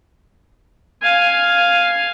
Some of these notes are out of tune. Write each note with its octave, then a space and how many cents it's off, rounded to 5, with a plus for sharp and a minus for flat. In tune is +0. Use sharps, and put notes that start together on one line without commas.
F5 +0 G#5 +0